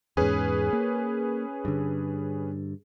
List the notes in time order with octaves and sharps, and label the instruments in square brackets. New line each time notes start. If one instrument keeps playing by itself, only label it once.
[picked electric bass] E2 G#2 [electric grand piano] C#4 G#4 B4
[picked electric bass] A#3
G2 D3